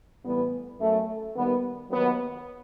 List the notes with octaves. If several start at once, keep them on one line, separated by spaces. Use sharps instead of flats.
A2 E3 G3 B3
F#2 F#3 A3
D#2 D#3 G3 B3
D#2 D#3 F#3 B3